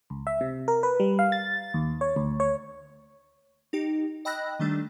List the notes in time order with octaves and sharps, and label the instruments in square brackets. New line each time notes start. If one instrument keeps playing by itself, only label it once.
[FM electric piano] C#2
E5
C3
A#4
B4
G3
F5
A6
D#2
C#5
D2
C#5
[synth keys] D#4 G4
D#5 G5 B5 E6 F#6 A#6
D#3 G3 A3 D4